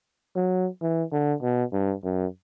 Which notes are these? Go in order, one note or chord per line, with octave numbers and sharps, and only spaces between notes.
F#3
E3
D3
B2
G2
F#2